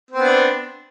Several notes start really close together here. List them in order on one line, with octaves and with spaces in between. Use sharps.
C4 B3 D4